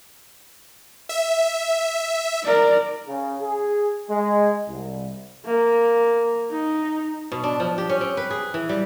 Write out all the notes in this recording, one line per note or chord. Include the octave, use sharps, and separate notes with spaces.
E5
A#4 D5
C#3
G#4
G#3
C2
A#3
D#4
B2
D4
F3
G4
C#4
C4
B4
G#4
E3
G3